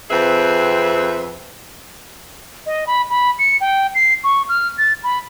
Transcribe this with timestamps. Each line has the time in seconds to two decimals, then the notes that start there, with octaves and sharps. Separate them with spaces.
0.11 F2 C4 G#4 B4 E5
2.66 D#5
2.87 B5
3.10 B5
3.39 C#7
3.61 G5
3.95 C7
4.24 C#6
4.49 F6
4.78 A6
5.04 B5